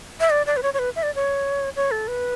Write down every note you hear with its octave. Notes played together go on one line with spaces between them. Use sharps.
E5
D5
D5
B4
C#5
C#5
B4
E5
D5
C#5
C#5
A4
B4